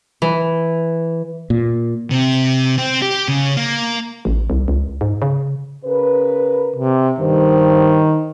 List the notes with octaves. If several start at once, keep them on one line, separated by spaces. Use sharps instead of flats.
E3
A#2
C3
C4
G4
C#3
A#3
A1
C2
C#2
G#2
C#3
C#3 A#4 B4
C3
G2 D#3 C5